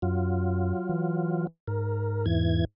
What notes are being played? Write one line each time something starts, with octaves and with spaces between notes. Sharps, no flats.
F#2 F#3 F4
E3
G#2 A#4
E2 E3 G#6